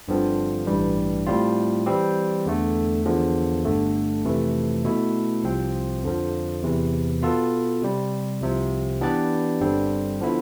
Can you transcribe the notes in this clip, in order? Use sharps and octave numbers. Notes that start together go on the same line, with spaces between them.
G1 G2 D3 F3 C4
A1 G2 E3 G3
A2 G3 C4 F4
E3 G3 C4 G4
E2 D3 A3
E2 D3 F3
G1 G2 D3 A3
F2 C3 E3 A3
B2 A3 E4
C2 C3 F3 C4
F2 D3 F3
E2 C3 E3
B2 B3 F4 A4
C3 G3 C4
C2 C3 F3
E3 B3 D4 G4 D5
G1 G2 D3 G3 C4
D3 F3 B3 E4